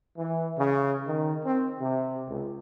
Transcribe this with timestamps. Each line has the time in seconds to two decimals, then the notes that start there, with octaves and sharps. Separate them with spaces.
0.17 E3
0.57 C#3
1.07 D#3
1.44 C4
1.79 C3
2.29 C#2